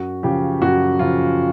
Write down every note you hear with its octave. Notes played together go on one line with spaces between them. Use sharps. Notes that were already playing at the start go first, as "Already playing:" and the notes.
Already playing: F#2 F#4
C#3 F3 G4
F#2 F#4
C#3 F3 F4